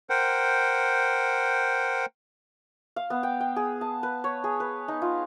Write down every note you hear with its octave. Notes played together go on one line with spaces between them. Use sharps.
A#4 C5 F#5 G5
F5
B3
G5
G5
G#4
A5
B4
C#5
G#4
B4
D#4
F4